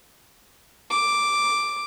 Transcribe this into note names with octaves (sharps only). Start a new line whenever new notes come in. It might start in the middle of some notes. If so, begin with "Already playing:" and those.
D6